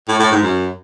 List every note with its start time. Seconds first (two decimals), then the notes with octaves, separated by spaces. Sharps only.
0.08 A2
0.19 A2
0.31 G#2
0.42 F#2